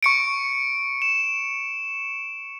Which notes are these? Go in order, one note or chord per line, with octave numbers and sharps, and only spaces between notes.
C#6 C#7 D7
E7